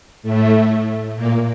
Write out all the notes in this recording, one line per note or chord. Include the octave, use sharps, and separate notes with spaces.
A2 A3
A#2 A#3